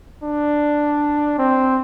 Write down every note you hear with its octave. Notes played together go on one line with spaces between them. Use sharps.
D4
C4